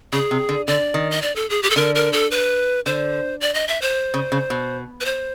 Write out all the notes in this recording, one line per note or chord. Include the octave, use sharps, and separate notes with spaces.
C#3 G#4
C3
D3
D3 D5
D#3
D#5
D5
A4
G#4
G4
A4
D3 A#4
A#4
A4
B4
D3 C5
D5
D#5
E5
C5
C#3
C#3
B2
B4
C5